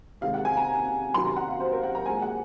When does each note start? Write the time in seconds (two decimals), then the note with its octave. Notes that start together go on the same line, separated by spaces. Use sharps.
0.21 C3 D#3 G#3 F5
0.34 F#5
0.45 G#5
0.57 A#5
1.14 C3 D#3 F#3 C6
1.25 A#5
1.37 F#5
1.48 F5
1.60 C5
1.72 A#4
1.83 F#5
1.95 A#5
2.06 A#2 G#3 G#5
2.22 F#5